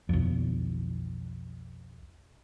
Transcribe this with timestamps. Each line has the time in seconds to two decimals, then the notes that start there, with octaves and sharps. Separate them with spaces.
0.09 B1 F2